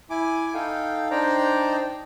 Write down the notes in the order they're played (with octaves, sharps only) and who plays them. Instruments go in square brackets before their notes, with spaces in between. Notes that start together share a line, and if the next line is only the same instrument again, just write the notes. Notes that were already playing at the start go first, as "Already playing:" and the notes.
[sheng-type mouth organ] E4 G#5 D6
D#4 A4 F5 G5
D4 D#4 C5 D5 G5 A#5